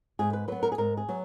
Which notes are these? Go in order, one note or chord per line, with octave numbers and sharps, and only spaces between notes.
G#2 G#4
B4
F#3 B3 B4
A#4
G#4
G#2 A#4
G#4
F#3 B3